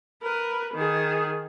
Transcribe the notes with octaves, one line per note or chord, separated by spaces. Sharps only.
A#4 B4
D#3 G#4